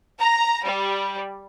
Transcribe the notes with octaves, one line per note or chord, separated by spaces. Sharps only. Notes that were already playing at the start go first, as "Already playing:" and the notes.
A#5
G3